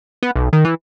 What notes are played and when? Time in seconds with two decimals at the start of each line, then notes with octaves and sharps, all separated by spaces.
0.23 B3
0.35 B1
0.53 D#3
0.65 E3